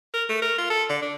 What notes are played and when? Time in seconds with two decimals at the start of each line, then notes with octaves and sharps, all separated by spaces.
0.14 A#4
0.29 A3
0.42 A#4
0.58 F4
0.70 A4
0.89 D3
1.02 D4